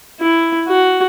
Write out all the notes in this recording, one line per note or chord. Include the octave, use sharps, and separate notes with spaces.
E4
F#4